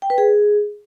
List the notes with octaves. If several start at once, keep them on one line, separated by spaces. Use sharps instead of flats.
G5
B4
G#4